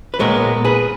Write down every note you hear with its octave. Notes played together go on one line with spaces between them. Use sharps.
B4
A#2 G#3 B3 A#4 C#5
G#4 B4